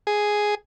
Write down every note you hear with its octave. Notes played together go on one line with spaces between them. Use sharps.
G#4